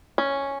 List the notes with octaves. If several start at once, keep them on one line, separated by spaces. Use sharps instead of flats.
C#4